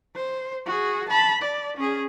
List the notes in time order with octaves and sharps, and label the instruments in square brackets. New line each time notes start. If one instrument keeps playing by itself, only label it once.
[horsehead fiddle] C5
F#4 G#4
A5 B5
D5
C#4 G#4